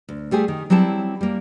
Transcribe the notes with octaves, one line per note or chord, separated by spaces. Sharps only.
D2
G3 A3 G4 G#4
D#3
F#3 G3 C4 E4 A5
G3 A#3